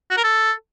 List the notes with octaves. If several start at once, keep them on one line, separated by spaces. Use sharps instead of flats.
F#4
A#4
A4